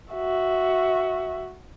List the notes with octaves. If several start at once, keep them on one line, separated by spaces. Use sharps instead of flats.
F#4 E5